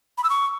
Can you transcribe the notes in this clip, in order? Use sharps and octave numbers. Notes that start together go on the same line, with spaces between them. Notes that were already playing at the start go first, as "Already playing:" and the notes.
B5
E6
C#6